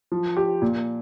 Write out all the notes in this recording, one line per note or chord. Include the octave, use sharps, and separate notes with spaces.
F3
G4
A#2